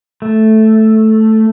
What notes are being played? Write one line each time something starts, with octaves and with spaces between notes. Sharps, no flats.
A3